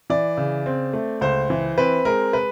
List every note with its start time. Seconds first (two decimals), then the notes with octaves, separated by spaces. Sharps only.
0.10 E3 D5
0.37 C#3
0.66 C4
0.93 A3
1.21 C#2 C5
1.50 E3
1.78 C4 B4
2.05 G#3 A#4
2.33 B4